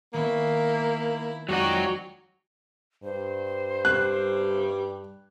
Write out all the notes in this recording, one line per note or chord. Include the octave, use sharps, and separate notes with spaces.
D#3 A#3 B3 C#4 E4
F2 F#3 G#3 D#4 F#4 D5 F#5 G5
G2 C5
G3 F#6